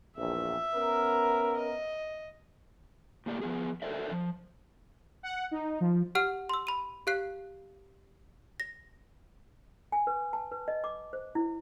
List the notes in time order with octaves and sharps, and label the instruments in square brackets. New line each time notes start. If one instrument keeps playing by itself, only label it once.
[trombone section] A#1 E2 [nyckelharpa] E5
[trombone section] B3 C#4 A#4
[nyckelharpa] D#5
[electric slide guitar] A2 A#3 G4 D5
F3 B3 G#4
A4 A#4 C5 D5 E5
F3
[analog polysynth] F#5
D#4
F3
[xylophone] G4 F#5 F6
C6 E6
B5 D#7
G4 F5 F#6 C7
A#6
[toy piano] G#5
B4
A5
B4
D#5
D6
C5
E4